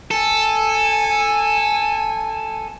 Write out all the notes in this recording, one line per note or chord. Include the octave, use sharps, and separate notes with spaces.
A4 G#5